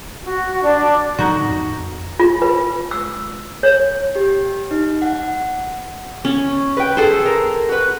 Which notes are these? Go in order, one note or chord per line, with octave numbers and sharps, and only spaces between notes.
F#4
D4
A2 D3 F#3 D#4 F#4
F2
F4
B4
E6
C#5
G4
D#4
F#5
C#4
B4 G5
G#4 A4 C5
A#4
F#4 B4